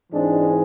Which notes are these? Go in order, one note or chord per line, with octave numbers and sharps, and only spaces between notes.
G#2 E3 G#3 C4 D4